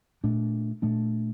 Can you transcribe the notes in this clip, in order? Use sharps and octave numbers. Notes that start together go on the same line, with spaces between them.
A#2 A3 D4
A#2 A3 D4